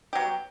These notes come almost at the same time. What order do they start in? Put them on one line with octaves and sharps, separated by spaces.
G4 F#3 B3